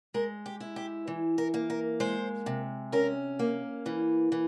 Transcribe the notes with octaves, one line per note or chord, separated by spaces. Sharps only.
G#3 A#4
G4
E4
G4
E3
A#4
A#3
A#4
G#3 C5
C3
C#4 A#4
A#3
E3
E3